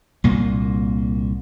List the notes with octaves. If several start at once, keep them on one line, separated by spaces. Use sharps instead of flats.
C2 A#2 A#3